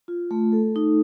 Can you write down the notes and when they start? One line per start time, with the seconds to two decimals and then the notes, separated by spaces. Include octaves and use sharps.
0.08 F4
0.31 A3
0.52 A4
0.76 D#4